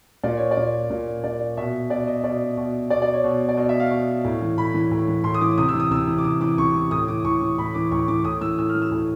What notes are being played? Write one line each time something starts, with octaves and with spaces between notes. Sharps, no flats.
A#2 D5
C#5
D5
A#2
A#2
A#2 D5
B2 E5
B2 D5
D#5
B2 D5
B2
B2 D5
D5
C#5
B2
D5
B2 D#5
E5
F5
B2
A2
E3
A2 B5
E3
A2
E3
A2 C6
D#6
E3 D6
C3 D#6
E6
E3
D#6
C3 E6
E3
D6
C3 D#6
E3 D6
C3 C#6
E3
A2 D#6
E3 D6
A2 C#6
E3
A2 B5
E3 D6
A2 C#6
E3 D6
A2 D#6
E3 E6
A2 E6
F6
E3
E6
A2